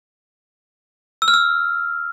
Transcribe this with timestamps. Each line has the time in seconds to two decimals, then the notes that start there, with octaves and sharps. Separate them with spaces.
1.22 E6
1.28 F6
1.34 E6